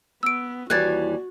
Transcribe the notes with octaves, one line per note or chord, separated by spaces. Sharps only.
B3 E6 D7
D#2 E3 G3 F#4 F#6 G#6 A6